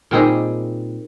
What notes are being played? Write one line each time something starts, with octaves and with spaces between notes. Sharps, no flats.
A#2 G3 C4 D#4 G#4